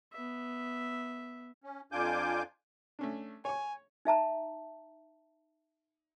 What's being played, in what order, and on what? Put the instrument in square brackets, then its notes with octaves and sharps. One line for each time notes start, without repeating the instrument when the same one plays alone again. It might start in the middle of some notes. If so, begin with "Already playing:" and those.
[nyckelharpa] B3 E5
[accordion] C#4
F2 D4 F4 G#5 D6 G6
[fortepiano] A3 C#4 D4
[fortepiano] C#5 C#6 [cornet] G#5
[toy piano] D#4 E5 A5 A#5